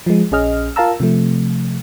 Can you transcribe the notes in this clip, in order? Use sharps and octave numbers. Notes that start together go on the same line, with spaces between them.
F3 G#3
A#1 C#4 G#4 D#5 F6
F4 A#4 F5 A5 A#5 E6
C3 F3 A3